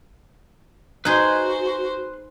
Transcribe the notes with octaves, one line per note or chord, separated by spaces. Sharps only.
D#4 F#4 G#4 B4 C5 C6